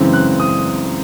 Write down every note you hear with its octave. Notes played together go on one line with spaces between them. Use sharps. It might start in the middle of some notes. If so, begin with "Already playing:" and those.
Already playing: F#2 C#3 E3 G#3 C4
F#6
D#6